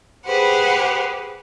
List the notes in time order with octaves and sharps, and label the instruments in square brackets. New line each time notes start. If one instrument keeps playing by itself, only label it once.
[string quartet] G4 G#4 B4 C5 F#5